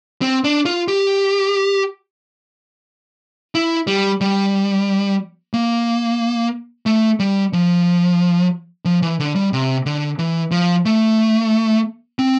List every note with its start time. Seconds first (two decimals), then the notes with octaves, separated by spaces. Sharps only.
0.22 C4
0.44 D4
0.66 F4
0.88 G4
3.55 E4
3.87 G3
4.21 G3
5.54 A#3
6.86 A3
7.20 G3
7.53 F3
8.85 F3
9.02 E3
9.20 D3
9.36 G3
9.53 C3
9.86 D3
10.19 E3
10.51 F3
10.85 A3
12.19 C4